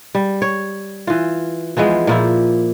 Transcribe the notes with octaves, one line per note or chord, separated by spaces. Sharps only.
G3
C#5
E3 F4
E3 F3 G#3 B3
A#2 F3 E4